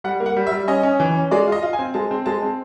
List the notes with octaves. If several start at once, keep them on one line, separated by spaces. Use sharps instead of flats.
G3 F#5
A#3
F#5
G3
E5
G3
C#4 D#5
C#4
E3
C#4
G#3 D5
F4 D#5
F4
G#5
C4
G#3 A5
C4
G#3 A5
C4